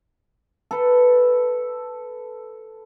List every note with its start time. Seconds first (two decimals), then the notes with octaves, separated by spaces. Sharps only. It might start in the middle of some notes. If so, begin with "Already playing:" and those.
0.71 A4 B4